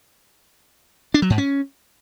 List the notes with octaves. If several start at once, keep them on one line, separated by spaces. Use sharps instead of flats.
D4
F#3
G#2
C#4